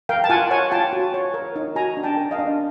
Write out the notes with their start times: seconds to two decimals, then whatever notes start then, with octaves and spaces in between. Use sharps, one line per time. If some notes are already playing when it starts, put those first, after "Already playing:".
0.09 A#4 F5 G5
0.24 A5
0.30 F4 F#5 G#5
0.51 C#5 F#5 G#5
0.71 F4 G5 A5
0.93 F#4
1.14 C#5
1.34 A#4
1.56 D#4
1.76 F#4 G#5 A#5
1.97 D4
2.03 G5 A5
2.17 A#4
2.31 D#5 F5
2.39 D4